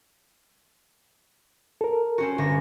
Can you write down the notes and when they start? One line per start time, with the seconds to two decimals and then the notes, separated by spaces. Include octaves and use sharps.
1.81 A4 A#4
2.18 C4 C#4 F#4
2.38 G1 F#4 A#6